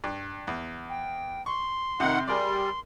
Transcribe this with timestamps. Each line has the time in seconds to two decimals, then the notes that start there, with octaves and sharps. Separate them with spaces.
0.04 G2
0.47 E2
0.90 G5
1.46 C6 C#6
2.00 F2 C3 D#3 F#5
2.27 G3 G#4 A#4 D5 C6